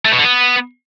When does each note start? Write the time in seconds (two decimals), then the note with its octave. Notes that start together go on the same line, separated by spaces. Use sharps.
0.05 A3
0.12 B2
0.18 D3
0.24 B3